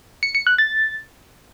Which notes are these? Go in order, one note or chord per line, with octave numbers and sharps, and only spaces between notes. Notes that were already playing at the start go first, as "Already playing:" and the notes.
C#7
C#7
F#6
A6